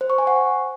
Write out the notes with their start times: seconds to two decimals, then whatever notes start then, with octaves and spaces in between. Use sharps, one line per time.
0.01 C5
0.10 C#6
0.18 G#5
0.27 F#5